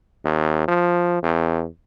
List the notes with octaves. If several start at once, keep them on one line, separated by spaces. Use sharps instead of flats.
D#2
F3
E2